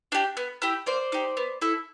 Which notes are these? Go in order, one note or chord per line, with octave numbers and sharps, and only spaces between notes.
D4 G4
B3
E4 G4
A#3 C5 D5
D#4 G4
B3
E4 A4